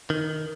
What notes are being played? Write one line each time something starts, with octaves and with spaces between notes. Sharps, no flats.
D#3